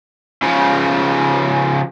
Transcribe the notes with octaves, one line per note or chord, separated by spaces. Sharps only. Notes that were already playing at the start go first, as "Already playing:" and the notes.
C#3 F3